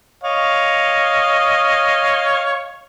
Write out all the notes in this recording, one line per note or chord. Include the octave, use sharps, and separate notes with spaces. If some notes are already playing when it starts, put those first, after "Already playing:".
C#5 D#5 F5